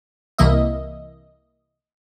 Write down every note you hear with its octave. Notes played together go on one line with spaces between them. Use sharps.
C2 C3 E3 A#3 D#5 E5